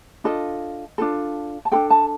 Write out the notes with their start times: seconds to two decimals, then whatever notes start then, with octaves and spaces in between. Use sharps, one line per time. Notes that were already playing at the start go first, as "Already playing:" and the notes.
0.24 D4 F4 A4 D#5
0.98 D4 F4 A4
1.65 A5
1.72 D4 F4 A4 G5
1.90 A5